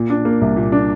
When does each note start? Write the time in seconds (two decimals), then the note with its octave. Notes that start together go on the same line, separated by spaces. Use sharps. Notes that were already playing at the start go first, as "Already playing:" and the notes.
Already playing: A#2
0.10 D4
0.25 A#3
0.41 C2
0.57 A#2
0.72 D4